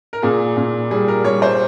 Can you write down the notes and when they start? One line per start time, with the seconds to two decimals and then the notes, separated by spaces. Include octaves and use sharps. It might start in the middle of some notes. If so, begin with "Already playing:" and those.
0.13 A#4
0.22 A#2 G#4
0.57 A#2
0.91 G3 G#4
1.08 A#4
1.24 G3 C#5
1.42 C5